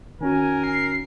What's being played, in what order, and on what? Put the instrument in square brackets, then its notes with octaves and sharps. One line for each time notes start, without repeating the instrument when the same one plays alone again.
[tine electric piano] D#3 C#4 F#4 [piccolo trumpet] A#4 [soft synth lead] G#5
[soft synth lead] C7